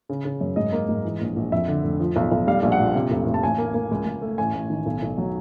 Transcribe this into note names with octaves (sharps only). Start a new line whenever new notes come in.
C#3
C#3
F#2
G#2 D#5
A#3
G#2
E3
A#1
A#1
F2 E5
D3
F1
F3
B1
B1
G3 F5
A#1
F#5
A#2
C3
F1
F1
A5
A1 G#5
A#3
A#3
C#2
C#2
A3
A1 G#5
A1
D#3
B1
B1
F#3